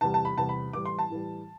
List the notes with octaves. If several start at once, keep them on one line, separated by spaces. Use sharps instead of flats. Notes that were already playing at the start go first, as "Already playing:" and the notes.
E2 C3 G3 A5
A5
B5
E2 C3 G3 A5
B5
A2 E3 G3 D6
C6
A5
A2 E3 G3